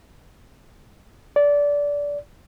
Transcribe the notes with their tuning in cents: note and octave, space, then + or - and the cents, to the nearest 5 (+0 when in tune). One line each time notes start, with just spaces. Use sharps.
D5 -20